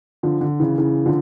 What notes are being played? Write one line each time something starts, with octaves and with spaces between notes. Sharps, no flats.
D3 F3
D3
C#3 E3
C#3 E3
D3 F3